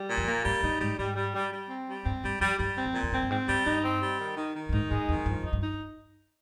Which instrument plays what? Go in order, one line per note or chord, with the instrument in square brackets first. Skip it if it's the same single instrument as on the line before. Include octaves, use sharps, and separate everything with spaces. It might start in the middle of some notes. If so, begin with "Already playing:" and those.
Already playing: [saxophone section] G3
A#2
[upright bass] F2
[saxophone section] A#3
[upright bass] G2 [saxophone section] G3
[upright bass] G2 [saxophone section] D#4
[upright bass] G#2 [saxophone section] G3
[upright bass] G#2 [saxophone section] G3
[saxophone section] G3
G3
G3
C4
G3
[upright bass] G2 [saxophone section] C4
[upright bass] G2 [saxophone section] G3
[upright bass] F2 [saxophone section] G3
[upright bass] G2 [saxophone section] G3
[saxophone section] C4
[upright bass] F2
[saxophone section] A#2
[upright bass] F2
[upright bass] G2 [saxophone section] C4
[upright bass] G2
[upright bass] G#2 [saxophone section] C4
[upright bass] G2 [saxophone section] G3
[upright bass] G2 [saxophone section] D#4
[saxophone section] C4
G3
D#3
D#3
D#3
[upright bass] G2
[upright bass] G#2 [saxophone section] D#4
[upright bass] G#2 [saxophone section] G#3
[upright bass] F2 [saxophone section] D#3
[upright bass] G2 [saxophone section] F3
[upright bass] F2 [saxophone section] D#4
[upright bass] G2
[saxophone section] D#4